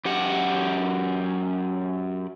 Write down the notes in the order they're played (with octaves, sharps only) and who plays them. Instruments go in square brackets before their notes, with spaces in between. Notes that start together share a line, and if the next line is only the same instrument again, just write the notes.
[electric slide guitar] F#2 G4 F#5